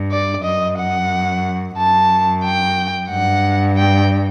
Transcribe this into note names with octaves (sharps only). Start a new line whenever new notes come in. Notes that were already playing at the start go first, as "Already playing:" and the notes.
Already playing: G2
D5
F#2 D#5
F#5
F#2 A5
G5
G2 F#5
G5